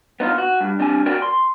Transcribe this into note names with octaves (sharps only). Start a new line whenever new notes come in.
B3 D#4 F4
F#4
G2
G3 C4 D4 G#5
F#4 A#4 D5 G5 G#5
C6